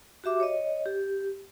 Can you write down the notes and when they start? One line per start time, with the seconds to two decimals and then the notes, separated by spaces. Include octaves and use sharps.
0.24 F#4 G4 E5 D6
0.40 C#5 D#5
0.86 G4